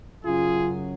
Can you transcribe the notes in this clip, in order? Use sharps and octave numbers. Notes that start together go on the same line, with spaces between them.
F#2 C#3 F#3 F4 G#4